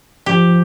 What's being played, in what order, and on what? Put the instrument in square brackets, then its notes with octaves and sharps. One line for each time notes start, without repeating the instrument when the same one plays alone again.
[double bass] F3 [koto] G4